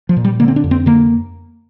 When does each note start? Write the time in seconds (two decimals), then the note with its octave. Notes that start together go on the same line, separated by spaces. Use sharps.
0.09 F3
0.17 A#2
0.25 G3
0.40 D3 A#3
0.48 C4
0.56 D4
0.64 F2
0.71 C4
0.86 D3 A#3